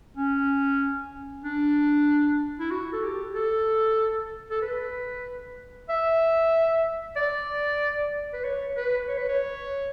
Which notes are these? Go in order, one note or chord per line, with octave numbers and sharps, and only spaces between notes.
C#4
D4
E4
F#4
A4
G4
A4
A4
B4
E5
D5
B4
C#5
B4
C#5
B4
C#5